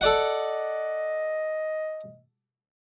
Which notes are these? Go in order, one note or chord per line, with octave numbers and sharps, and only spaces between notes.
A4 D5 D#5 F#5